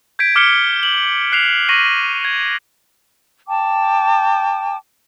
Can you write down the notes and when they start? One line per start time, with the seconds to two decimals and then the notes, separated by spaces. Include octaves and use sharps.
0.19 G6 G#6 B6 D7
0.36 D6 F6 B6 C#7 G7
0.83 F#7
1.32 F#6 C7 E7 F7
1.69 C#6 A#6 B6 D#7 F#7
2.25 G#6
3.48 G5 A5 D6